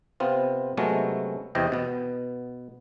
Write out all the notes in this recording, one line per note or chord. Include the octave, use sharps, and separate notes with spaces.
C3 B3 C4 F4
C3 F#3 G#3 A3 B3 C#4
E2 C3 D#5 G5
B2 B3